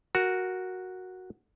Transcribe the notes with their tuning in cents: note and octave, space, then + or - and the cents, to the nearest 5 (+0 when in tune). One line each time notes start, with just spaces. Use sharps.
F#4 +0 A#4 +0